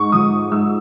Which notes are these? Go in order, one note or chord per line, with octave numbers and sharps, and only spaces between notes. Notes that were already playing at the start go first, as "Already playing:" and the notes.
Already playing: G#2 C#6
F3 D#6
G#2 E6